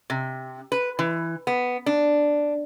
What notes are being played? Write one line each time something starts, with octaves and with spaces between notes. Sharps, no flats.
C3
B4
E3
B3
D4